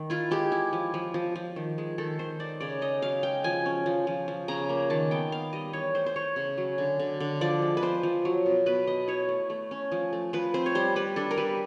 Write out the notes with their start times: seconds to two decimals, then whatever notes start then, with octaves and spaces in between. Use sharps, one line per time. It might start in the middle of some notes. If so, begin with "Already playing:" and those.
Already playing: D#3
0.10 E4 F4
0.31 G#3 G4
0.52 E4
0.73 F3
0.94 F3
1.14 F3
1.36 F3
1.56 D#3
1.78 G#3
1.98 D#3 A4
2.19 D#3 C5
2.40 D#4 D5
2.60 C#3 D5
2.81 D#4 D#5
3.02 F#3 F5
3.23 G#3 G5
3.44 F3 G#5
3.66 C#4
3.86 F3
4.07 F3
4.28 F3
4.48 C#3 A#5
4.69 A#3
4.90 D#3 A5
5.11 B3 G5
5.32 B3 F5
5.53 G3 D#5
5.73 E3 C#5
5.95 A3 C5
6.06 C5
6.16 A3 C#5
6.36 C#3
6.58 F#3
6.78 D3
6.99 D3
7.20 D3
7.41 F3 D5
7.62 G#3
7.77 B4
7.82 F3 C5
8.03 F3
8.25 F#3
8.46 B2
8.66 B2 B4
8.87 B3 D#5
9.08 E4 C#5
9.28 A3
9.50 A3
9.71 C#4
9.92 F3
10.13 A3
10.33 F3 B4
10.54 C4 C5
10.66 C#5
10.75 G3 C5
10.96 G3 B4
11.16 D4 A4
11.31 A#4
11.38 G3 B4